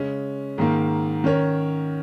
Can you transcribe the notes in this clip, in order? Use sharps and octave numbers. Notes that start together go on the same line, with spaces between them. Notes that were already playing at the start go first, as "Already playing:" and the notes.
Already playing: C#3 G#3 C#4
G#2 D#3 A#3
D#3 C#4 A#4 C#5